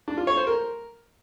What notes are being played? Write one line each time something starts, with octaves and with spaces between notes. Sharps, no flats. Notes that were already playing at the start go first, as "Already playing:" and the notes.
D4
F4
C#5
C5
A#4